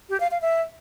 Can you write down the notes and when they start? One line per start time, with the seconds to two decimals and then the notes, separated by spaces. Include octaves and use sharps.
0.10 G4
0.20 F5
0.31 F5
0.42 E5